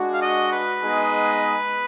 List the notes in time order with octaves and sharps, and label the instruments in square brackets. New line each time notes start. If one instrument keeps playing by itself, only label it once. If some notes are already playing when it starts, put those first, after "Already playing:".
Already playing: [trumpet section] G#3 D4 F#4
[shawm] F5
D#5
B4
[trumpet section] G#3 B3 D#4 G#4 D#5